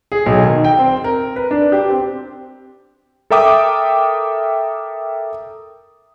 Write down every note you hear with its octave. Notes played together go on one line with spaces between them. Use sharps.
G#4
B1
D#3
G5
C4
A#4
B4
D4
G4
C4
A4 A#4 E5 G5 D6 D#6